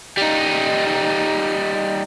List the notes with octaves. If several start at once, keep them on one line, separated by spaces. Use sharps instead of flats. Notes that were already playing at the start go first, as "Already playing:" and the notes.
G3 D#4